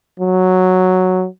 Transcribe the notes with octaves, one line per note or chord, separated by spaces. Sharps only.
F#3